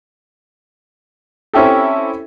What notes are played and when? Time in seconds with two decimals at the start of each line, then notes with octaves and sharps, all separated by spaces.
1.53 C4 C#4 E4 G4 A4